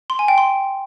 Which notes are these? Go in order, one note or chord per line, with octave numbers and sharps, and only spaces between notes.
C6
G#5
G5
C6